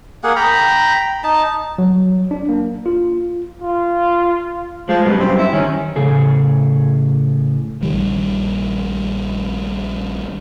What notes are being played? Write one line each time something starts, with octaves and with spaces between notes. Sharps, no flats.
A#3 G#4 F#5
G5 A#5 B5
D#4 A5
F#3
D4
A#3
F4
F4
F3 G#3
F#2 B2 G3
C4
E4
D#3 C#4
A2 C#3 G#4 A4
A#1 D#3 G3